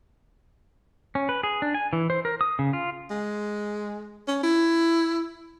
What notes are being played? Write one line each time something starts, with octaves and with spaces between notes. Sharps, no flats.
C#4
B4
G#4
D4
G#5
E3
C5
A#4
D#6
C#3
F4
G#3
C#4
E4